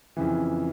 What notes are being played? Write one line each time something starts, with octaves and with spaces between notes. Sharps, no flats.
F2 C#3 E3